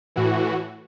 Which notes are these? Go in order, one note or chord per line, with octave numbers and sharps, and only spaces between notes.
A2 E3 F#4